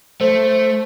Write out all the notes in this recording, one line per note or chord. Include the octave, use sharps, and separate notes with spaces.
A3 C5